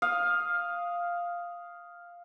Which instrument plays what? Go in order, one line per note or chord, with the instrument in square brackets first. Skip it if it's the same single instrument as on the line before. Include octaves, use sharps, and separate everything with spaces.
[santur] F5 [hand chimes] D#6